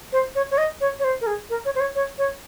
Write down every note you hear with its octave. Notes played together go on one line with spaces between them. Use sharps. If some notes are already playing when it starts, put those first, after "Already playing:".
C5
C#5
C#5
D#5
C#5
C#5
C5
A#4
G#4
A#4
C#5
C5
C#5
C#5
C#5